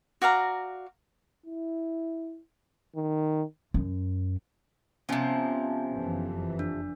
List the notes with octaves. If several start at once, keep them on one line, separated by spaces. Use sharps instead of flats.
F#4 D5 F5 A#5
E4
D#3
F#2
C3 F3 B3 C#4 G#5
F#1 F2 E3
D4